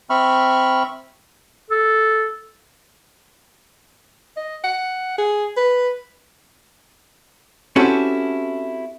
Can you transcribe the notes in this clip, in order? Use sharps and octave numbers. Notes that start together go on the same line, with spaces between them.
C4 E5 B5 C#6 F6
A4
D#5
F#5
G#4
B4
C4 C#4 E4 F#4 G4 A4